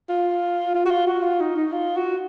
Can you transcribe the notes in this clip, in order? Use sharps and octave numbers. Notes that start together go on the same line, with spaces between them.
F4
F4
F#4
F4
F#4
F4
D#4
D#4
F4
F#4